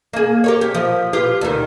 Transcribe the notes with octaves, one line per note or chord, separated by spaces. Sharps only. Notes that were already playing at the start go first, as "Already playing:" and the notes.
A#3 G#4
G4 A#4 C#5
G4
F3
F4 G4 B4
D2 D#3